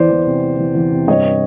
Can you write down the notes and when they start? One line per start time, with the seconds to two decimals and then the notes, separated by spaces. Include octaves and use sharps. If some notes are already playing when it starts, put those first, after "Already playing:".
Already playing: E2 E3 C5 D5
0.10 E2
0.26 C3
0.43 E3
0.58 E2
0.75 E2
0.91 C3
1.08 G2 C#5 D#5